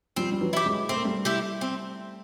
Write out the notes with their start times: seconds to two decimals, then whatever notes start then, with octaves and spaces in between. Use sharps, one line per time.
0.16 F3 G3 C4
0.32 G3
0.41 E3 F#3
0.53 E4 G4
0.66 F#3 G#3
0.89 A3 C4
0.97 A#3
1.04 G3 A3
1.25 E4 G4
1.61 C4